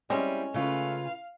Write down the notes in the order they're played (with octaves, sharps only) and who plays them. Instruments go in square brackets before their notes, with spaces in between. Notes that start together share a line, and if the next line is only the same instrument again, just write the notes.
[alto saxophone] G3 [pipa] G#3 C#4 [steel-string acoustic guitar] C4 E4
[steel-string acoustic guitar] C#3 F4 B4 [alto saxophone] A3 [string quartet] F5